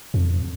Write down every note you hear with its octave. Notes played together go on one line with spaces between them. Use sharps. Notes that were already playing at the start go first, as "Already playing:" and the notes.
F2